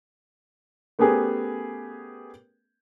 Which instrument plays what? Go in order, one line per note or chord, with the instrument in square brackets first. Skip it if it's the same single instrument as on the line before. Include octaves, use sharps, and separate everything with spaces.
[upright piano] A3 B3 C#4 G4 G#4 A#4